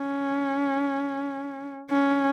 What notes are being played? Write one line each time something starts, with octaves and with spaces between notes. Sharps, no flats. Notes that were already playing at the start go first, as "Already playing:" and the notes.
Already playing: C#4
C#4